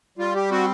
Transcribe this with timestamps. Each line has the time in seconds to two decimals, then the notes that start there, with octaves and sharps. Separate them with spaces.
0.18 G3 F4
0.35 G4
0.51 C4 F#4